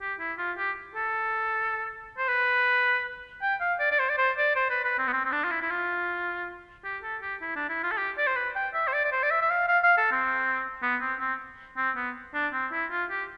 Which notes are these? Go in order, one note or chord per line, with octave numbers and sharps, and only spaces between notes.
G4
E4
F4
G4
A4
C5
B4
G5
F5
D5
D5
C5
D5
C5
D5
C5
B4
B4
C4
B3
C4
C4
D4
F4
E4
E4
F4
G4
A4
G4
E4
D4
E4
F4
A4
G4
D5
C5
B4
G5
E5
C5
D5
D5
C5
D5
E5
E5
F5
F5
F5
A4
C4
B3
C4
C4
C4
B3
D4
C4
E4
F4
G4